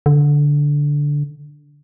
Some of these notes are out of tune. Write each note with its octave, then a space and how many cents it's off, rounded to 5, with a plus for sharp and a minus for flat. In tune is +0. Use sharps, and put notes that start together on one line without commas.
D3 -10